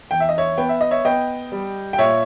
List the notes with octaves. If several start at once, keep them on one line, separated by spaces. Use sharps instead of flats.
E2 G5
E5
D#5
C#5 E5
B3 G5
E5
D#5
C#5 E5
B3 D#5 G5
G3
G5
A#2 C#5 E5